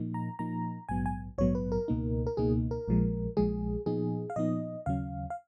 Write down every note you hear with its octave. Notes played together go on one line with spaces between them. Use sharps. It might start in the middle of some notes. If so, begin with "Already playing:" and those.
Already playing: A#2 F3 A#3 D#4
A#5
A#2 F3 A#3 D#4 A#5
A#1 G#2 F#3 B3 G#5
G#5
A#1 G#2 F#3 B3 C#5
B4
A#4
C#2 B2 A#3 D#4
A#4
C#2 B2 A#3 D#4 G#4
A#4
A#1 A#2 F3 G#3
A#1 A#2 F3 G#3 G#4
A#2 F3 B3 D#4 G#4
F5
A#2 F3 B3 D#4 D#5
D#2 C#3 F#3 C#4 F5
F5